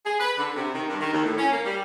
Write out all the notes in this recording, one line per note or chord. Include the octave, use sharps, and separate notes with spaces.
G#4
B4
D3
C3
D#3
G2
D#3
D#2
A2
C#4
A#3
G3